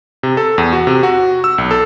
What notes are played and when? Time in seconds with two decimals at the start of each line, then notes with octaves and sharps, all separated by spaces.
0.23 C3
0.37 A4
0.58 E2
0.73 F#4
0.87 C3
1.03 F#4
1.44 E6
1.58 B1
1.71 A4